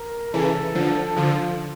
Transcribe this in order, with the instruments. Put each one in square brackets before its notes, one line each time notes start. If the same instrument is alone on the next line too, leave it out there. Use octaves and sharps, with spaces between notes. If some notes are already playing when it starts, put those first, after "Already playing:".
Already playing: [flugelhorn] A#4
[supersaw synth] C#3 E3 [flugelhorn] A4
[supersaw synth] D3 F3
[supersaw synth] D3 F3 [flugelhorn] F4